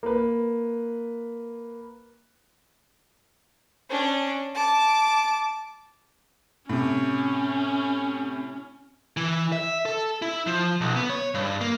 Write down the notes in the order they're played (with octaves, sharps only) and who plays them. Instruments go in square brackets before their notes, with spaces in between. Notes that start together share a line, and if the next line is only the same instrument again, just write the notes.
[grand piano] A#3 B4
[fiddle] C#4 D4
A5 D6
[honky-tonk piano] A2 C3 [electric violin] C#4
[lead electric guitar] E3
E5
A4
E4
F3
B1
B3
C#5
G2
A#3